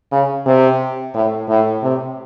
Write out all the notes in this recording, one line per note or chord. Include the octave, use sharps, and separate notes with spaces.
C#3
C3
A2
A2
C3